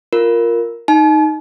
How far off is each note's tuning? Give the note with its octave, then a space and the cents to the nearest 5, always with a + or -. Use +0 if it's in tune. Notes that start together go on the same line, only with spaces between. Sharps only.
F4 +0 A#4 +0
D#4 +0 A5 -45